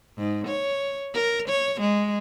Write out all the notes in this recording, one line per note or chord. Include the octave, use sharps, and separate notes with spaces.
G#2
C#5
A#4
C#5
G#3